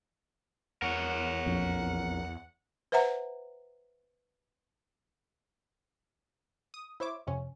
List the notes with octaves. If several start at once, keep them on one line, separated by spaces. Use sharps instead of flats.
E2 A#4 C#5 F#5
A#1 F2
B4 C5 E5 F#5 A#5
D#6
E4 C5 C#5 E5 D6
F2 C3 C#4